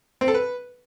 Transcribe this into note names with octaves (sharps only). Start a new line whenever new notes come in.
C4
A4
B4